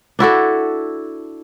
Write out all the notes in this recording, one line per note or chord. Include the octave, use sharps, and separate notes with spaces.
D4 E4 F#4 A4